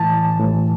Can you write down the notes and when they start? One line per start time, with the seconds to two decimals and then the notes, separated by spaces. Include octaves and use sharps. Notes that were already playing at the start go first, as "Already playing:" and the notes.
Already playing: A2 E3 A5
0.40 A2 E3